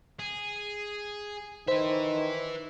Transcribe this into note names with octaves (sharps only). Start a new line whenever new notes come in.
G#4
D#3 B4 C5 E5